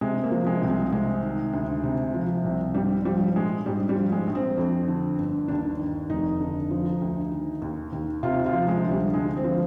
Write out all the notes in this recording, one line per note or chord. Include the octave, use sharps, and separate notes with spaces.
C3 G#3
A#3
F3
G#3
C2
G#3
C3 G#3
D#3
D2
C3
F3
C2
G#2 G3
F3 G3
A#1 G#3
G#2 G3
G3
F3
G#3
A#1
C4
F2
D3
G1
D#2 D4
D#3
F1 D#4
D3
F3
D2
D#3
D#2
D#2
C3 F4
F4
F3
G#3
D2
G3
D3 G#3
C4
F3